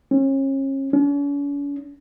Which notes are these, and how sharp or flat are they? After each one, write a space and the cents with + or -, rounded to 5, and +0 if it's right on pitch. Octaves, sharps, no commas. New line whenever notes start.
C#4 -35
C#4 +45